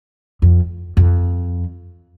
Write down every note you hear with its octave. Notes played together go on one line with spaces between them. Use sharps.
F2
F2